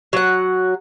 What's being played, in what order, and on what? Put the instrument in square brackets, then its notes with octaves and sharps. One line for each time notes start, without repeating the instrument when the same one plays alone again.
[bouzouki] F#3 F#5